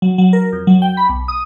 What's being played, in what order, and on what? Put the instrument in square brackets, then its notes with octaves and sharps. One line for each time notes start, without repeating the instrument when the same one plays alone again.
[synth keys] F#3
F#3
A#4
F2
F#3
G5
B5
B1
D#6